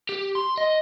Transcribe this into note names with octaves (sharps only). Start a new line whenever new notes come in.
G4
C6
D#5